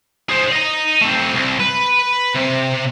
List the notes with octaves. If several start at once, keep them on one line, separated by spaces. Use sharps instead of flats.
G#4 C5
D#5 A#5
A3 C4
C2
B4
C3